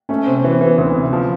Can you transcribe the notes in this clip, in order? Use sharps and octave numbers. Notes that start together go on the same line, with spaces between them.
A3 C#4
C3 C4
E3 B3
E3 B3
D2
C3
F3